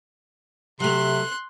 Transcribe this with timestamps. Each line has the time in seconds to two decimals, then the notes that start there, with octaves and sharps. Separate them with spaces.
0.80 C3 F#3 A3 C6 F#6